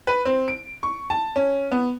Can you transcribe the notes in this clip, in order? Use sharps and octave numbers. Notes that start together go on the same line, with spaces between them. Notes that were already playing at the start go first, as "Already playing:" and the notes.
B4
C4
D7
C#6
A5
C#4
B3